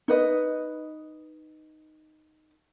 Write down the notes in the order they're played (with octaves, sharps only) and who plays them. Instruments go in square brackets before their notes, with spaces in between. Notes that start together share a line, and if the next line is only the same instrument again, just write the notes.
[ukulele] D#4 B4 D#5